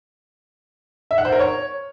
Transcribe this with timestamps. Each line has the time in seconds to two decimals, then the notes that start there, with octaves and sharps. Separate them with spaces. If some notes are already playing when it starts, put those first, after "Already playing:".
1.11 E5
1.18 F#5
1.25 C5
1.32 A#4
1.39 C#5